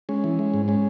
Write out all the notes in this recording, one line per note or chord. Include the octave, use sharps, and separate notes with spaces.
G#3 C#4
E3
G#3
G#2
G#3 C#4